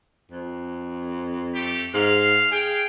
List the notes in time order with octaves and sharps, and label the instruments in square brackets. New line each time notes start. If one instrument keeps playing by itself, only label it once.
[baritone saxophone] F2
[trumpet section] A3 G4
[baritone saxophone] G#2 [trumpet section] F5
[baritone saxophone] G#4 [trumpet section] F5 G5